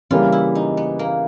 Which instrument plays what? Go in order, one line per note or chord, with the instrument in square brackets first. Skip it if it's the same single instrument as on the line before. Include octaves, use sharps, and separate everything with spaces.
[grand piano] C#3 E3 G3 A#3 [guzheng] F4
[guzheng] E4
D#4
B3
A#3